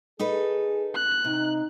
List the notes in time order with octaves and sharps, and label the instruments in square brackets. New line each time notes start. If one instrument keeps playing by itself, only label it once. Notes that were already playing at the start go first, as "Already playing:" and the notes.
[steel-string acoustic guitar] D#4 A4 B4 [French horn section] G#4
[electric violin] F#6
[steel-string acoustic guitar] C3 [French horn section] D#4